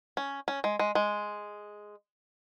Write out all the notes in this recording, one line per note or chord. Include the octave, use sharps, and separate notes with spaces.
C#4
C#4
G#3
G#3
G#3